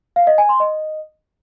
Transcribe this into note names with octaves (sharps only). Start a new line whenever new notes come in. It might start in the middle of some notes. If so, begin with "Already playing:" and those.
F5
D#5
G#5
C6
D#5